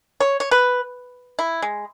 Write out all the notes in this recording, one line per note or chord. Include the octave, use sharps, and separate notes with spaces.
C#5
C#5
B4
E4
G#3